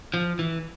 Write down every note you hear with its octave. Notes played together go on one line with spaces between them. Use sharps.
F3
E3